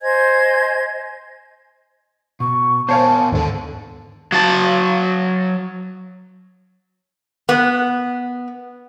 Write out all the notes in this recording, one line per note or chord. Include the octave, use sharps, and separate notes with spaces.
C5 D#5 G#5 G#6
B2 C#6
B3 A#4 C5 C#5 F5 G#5 A5
D#2 G#2 D3 D#3 A4
F#3 A5
B3